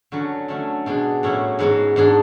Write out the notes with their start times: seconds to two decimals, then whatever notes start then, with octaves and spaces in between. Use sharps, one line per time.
0.12 D3 F#3 C#4 F#4 B4
0.48 D3 F#3 A3 C#4
0.86 B2 G#3 B3 D4 G#4
1.23 A2 F#3 C#4 E4
1.59 G#2 G#3 B3 F#4 B4
1.96 G#2 G#3 D4 G#4